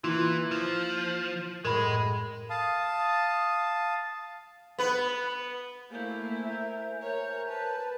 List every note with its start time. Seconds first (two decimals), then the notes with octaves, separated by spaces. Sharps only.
0.04 E3 A#3 E4 F4 C6
0.51 F3
1.65 F#2 A2 G#3 A#4 B5
2.50 F5 A5 D#6
4.79 B3 B4
5.90 A3 A#3 E4 C5 F5 G#5 G6
6.44 A#4 E5
7.01 A#4 C#5 A#5
7.49 B4 A5